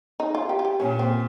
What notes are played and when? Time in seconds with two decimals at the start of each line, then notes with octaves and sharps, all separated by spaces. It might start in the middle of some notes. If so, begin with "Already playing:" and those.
0.20 D#4
0.35 F4
0.49 G4
0.59 F4
0.65 G4
0.80 A#2 C#4
0.99 C4